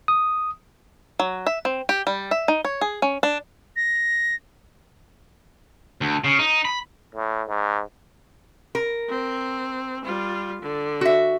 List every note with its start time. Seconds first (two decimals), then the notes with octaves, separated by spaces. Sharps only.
0.08 D#6
1.19 F#3
1.47 E5
1.65 C4
1.89 G4
2.07 G3
2.31 E5
2.48 D#4
2.65 C#5
2.81 G#4
3.02 C#4
3.23 D4
3.76 A#6
6.01 D2
6.24 C#3
6.39 D#4
6.65 B5
7.15 A2
7.48 G#2
8.75 A#4
9.09 C4
10.04 G3 F4
10.62 D3
11.01 F#4 E5